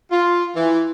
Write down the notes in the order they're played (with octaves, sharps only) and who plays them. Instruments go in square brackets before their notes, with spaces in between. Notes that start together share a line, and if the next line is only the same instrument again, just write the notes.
[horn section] F4
E3